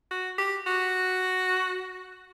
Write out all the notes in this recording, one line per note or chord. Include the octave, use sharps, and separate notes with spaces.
F#4
G4
F#4